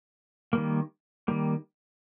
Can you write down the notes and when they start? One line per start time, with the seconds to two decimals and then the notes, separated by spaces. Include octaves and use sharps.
0.53 D#3 G3 A#3
1.28 D#3 G3 A#3